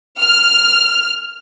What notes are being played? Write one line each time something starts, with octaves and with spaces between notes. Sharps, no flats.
F6